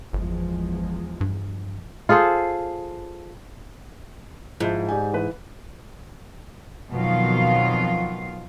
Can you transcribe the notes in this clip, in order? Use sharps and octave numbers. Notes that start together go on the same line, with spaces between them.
G1 E2 F3 G#3
G2
F4 G#4 A4 C5
G#2 F3 E4
G4 D5 G#5
E3 B4
F2 B2 D#3 F#3 F4 F5